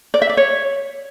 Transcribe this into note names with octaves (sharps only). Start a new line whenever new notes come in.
D5
E5
D5
C#5